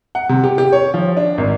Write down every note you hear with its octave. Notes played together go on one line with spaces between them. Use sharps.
F#5
C3
G4
G4
C#5
F3
D4
G#1